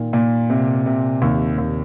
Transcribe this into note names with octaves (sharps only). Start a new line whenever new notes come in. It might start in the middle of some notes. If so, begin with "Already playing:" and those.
Already playing: A#2 D#3
A#2
C3
C3
D#2
D#2